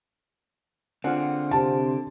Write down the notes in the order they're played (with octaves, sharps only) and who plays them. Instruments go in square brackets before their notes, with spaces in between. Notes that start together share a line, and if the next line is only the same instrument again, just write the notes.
[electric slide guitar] D3 C4 [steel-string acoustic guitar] F4 G#4 F#5
[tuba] C3 [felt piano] A5